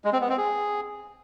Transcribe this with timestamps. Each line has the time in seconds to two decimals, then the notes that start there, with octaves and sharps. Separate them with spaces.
0.04 G#3
0.13 C4
0.21 B3
0.29 C4
0.38 G#4